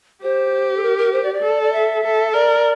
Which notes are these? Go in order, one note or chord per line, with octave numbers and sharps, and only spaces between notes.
G4 C5
A4
A#4
A#4
C5
D5
D5
A4
D5
E5
A4
A#4 D5